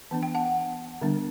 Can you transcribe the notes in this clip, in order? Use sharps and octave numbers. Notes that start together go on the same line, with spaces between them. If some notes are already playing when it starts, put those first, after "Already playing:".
E3 B3 D4 A5
G5
F#5 A5
D3 G3 B3 D4